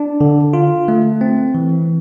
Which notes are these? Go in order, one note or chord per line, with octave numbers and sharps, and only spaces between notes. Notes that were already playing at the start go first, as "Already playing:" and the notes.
Already playing: D4
D3
F4
A3
C4
E3